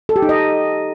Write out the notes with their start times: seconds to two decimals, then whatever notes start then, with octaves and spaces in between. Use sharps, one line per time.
0.09 A4
0.16 G4
0.22 D#4
0.29 D#5